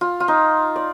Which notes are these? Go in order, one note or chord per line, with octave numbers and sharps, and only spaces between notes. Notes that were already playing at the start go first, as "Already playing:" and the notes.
F4
F4
D#4
D5